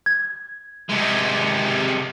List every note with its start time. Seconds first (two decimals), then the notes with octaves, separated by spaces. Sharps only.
0.06 G#6
0.90 C3 G#3